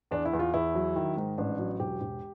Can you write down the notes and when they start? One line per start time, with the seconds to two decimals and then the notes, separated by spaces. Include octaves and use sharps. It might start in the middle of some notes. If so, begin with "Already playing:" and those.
0.11 E2 D4
0.25 E4
0.33 E2
0.39 F4
0.54 E2 E4
0.75 F#3
0.96 D#3
1.17 G#2
1.38 A1 D4
1.59 F#3
1.80 E1 G4
2.01 E1